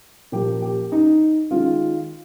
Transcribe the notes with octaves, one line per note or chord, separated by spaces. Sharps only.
A#2 F3 A#3 G4
G4
D#4
D#3 G#3 F4